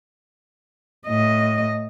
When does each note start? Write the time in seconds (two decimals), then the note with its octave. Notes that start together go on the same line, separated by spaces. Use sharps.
1.07 A2 D#5